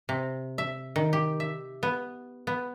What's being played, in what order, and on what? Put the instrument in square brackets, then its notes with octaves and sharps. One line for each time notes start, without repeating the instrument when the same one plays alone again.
[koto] C3
E5
D#3
G4
E5
B3
B3